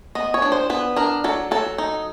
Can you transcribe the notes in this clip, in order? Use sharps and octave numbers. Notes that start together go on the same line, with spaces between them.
B3 D#5
C#5
D4
C5
B3 B4
D4 A#4
F#3 A4
F#3 A4
D#4